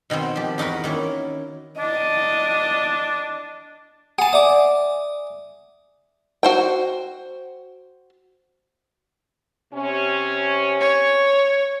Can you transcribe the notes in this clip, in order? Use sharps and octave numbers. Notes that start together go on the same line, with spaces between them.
B2 D#3 B3 C4
F3 G4
E2 D#4 F#4 A#4 B5
D#3 A#3 C#4 E4
D4 D#5
G#4 F#5 G#5 A5
D5 E5 D6 D#6
F#4 C5 G5
C3 C#4
C#5